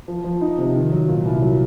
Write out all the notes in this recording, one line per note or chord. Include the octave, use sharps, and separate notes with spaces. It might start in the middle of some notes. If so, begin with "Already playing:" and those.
F3
F3
D#4
C3
D#3
F#3
A#2
C2
F#3